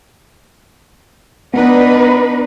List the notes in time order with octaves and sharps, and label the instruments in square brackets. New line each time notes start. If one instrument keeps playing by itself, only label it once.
[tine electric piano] B3 [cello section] D4 D#4 B4